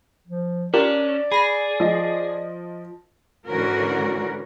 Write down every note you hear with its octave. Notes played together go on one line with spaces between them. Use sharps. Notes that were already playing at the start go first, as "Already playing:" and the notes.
F3
C#4 D4 F4 G4 A#4 D5
G#4 B5 A#6
F3 D#5
G#2 D3 E3 C#4 F#4 A#4